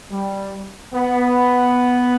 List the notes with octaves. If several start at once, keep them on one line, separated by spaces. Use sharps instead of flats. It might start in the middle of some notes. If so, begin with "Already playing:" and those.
G3
B3